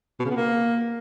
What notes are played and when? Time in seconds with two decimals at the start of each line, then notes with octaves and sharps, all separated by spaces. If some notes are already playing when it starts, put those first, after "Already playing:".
0.20 B2
0.25 C#3
0.31 B3
0.36 A#3